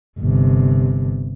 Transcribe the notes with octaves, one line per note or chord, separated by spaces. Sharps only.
G1 C3